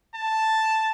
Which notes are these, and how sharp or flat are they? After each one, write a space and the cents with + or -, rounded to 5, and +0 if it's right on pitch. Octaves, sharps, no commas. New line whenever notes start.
A5 +0